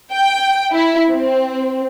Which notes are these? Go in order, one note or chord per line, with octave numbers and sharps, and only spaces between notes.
G5
E4
C4